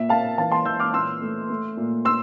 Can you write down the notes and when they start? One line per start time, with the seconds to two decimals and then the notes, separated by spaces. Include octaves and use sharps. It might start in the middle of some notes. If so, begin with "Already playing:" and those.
Already playing: A#2 E5
0.09 A#3 F5 A5
0.38 E3 F5 A5
0.51 A5 C6
0.65 E3 E6 G6
0.80 D6 F6
0.94 A#2 C6 E6
1.22 A3
1.50 A3
1.77 A#2
2.05 C6 E6